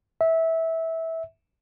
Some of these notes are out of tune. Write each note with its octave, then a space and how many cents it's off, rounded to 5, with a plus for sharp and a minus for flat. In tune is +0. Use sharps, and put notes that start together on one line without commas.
E5 -20